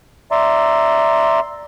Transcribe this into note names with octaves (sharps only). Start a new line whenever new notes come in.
D5 E5 A#5 C6